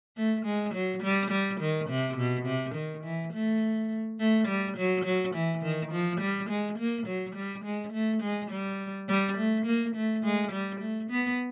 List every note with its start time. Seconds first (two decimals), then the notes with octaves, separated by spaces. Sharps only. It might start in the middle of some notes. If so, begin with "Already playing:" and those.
0.17 A3
0.46 G#3
0.74 F#3
1.03 G3
1.31 G3
1.61 D#3
1.90 C3
2.17 B2
2.46 C3
2.75 D#3
3.04 E3
3.33 A3
4.20 A3
4.48 G3
4.77 F#3
5.05 F#3
5.35 E3
5.63 D#3
5.92 F3
6.21 G3
6.50 G#3
6.79 A#3
7.07 F#3
7.35 G3
7.65 G#3
7.93 A3
8.22 G#3
8.51 G3
9.09 G3
9.37 A3
9.66 A#3
9.95 A3
10.24 G#3
10.52 G3
10.81 A3
11.11 B3